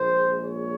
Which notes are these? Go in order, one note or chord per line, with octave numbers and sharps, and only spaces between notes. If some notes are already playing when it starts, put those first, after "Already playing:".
Already playing: A#1 A#2 G#3 C5
C#5